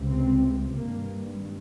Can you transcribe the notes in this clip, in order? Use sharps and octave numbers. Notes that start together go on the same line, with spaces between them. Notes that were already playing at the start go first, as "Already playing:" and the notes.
Already playing: C#2 C3
C4
G#1 G2 A#3